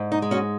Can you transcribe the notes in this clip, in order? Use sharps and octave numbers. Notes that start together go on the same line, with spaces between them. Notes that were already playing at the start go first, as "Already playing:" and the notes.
Already playing: G#2
D#4
G#3
C#4 F#4